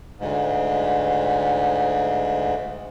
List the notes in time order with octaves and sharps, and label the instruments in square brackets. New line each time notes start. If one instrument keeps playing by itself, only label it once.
[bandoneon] D2 G#2